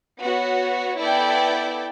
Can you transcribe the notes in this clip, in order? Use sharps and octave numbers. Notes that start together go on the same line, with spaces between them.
B3 F#4 C#5
B3 E4 A4 D5 G5